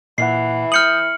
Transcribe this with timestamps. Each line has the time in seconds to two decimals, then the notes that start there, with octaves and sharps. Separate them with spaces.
0.18 A#2 E3 F#5 C7
0.72 D#6 F6 G6 C#7 F#7